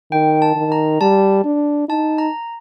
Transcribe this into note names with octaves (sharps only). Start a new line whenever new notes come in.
D#3 G5
A5
D#3
A#5
G3 A5
D4
D#4 A5
A#5